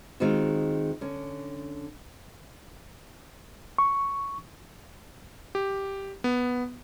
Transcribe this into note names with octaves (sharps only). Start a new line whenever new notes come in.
D#3 G#3 C4 F4 F#4
D3 C#4
C#6
G4
B3